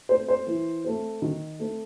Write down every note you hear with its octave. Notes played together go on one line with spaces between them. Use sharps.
A3 C4 C5
C5
E3
A3 C4
D#3
A3 C4